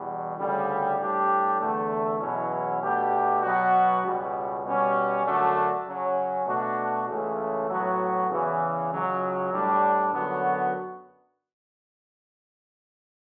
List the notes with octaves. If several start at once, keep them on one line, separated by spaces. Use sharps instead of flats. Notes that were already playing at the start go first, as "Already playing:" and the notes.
Already playing: E2 B2 G3
D2 C#3 G3
A2 G3 D4 G4
E2 D3 A3
E2 B2 F#3 C#4 E4
B2 A3 D4 G4
B2 F#3 B3 F#4
C#2 B2 G3
B2 G3 C#4
F#2 D3 A3 D4 F#4
C#3 F#3 C#4
B2 A3 D4 F#4
C#2 C#3 E3 A3
A2 F#3 B3 F#4
E2 C#3 E3
C#2 C#3 F#3
A2 G3 D4
F#2 D3 F#3 B3 F#4